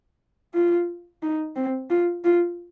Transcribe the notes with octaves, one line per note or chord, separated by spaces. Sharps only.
F4
D#4
C4
F4
F4